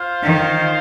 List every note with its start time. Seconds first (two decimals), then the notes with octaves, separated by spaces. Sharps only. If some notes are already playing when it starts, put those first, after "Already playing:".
Already playing: F4 C5 F5
0.23 D#3